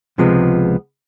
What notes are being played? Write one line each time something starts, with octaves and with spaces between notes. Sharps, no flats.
C#2 C3 F3 G#3 B3